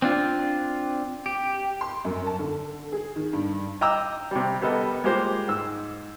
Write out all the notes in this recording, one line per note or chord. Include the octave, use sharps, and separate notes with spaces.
C4 D4 F4
G4
C6
F#2
A5
D3
G#4
D#3
G2
D#5 G5 A#5 D6 E6
C3 G3
G3 B3 A4 A#4 D#5
G#3 A#3 F4 G4 C5
G#2 E6